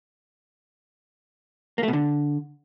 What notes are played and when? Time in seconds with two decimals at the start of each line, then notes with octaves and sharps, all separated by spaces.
1.78 A#3
1.83 A3
1.88 B2
1.93 D3